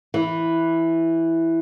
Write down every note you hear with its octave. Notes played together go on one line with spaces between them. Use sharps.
E3